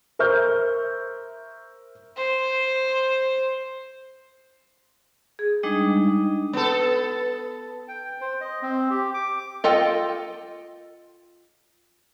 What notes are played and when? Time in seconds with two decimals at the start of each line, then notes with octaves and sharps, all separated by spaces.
0.19 A#4 C5 E5 C#6 F6 G6
2.16 C5
5.39 G#4
5.63 G3 G#3 D4 D#4 D#5
6.53 B3 A4
7.88 G5
8.21 C5
8.40 D#5
8.62 C4
8.90 G4
9.14 D6
9.64 F4 A4 D#5 G5